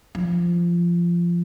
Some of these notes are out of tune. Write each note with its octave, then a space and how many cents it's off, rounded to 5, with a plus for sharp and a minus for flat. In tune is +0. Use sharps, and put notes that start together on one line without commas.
F3 -15